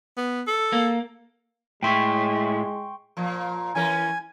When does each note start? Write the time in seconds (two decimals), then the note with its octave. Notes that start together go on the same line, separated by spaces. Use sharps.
0.17 B3
0.47 A4
0.73 A#3
1.82 A2 G#3 E4 G5 C6 C#6
3.17 A#2 F3
3.75 E3 C#4 A#4 G#5